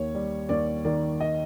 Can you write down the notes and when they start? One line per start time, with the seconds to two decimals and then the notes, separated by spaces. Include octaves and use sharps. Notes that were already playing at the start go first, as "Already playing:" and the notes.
Already playing: D#2 C#5
0.15 G3
0.49 D#2 D5
0.85 D#3 D5
1.20 D#5